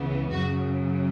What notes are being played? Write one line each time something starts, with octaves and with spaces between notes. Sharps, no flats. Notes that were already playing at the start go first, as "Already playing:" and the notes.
Already playing: C#2 C#3 E3 B3
F#2 C#3 F#3 F#4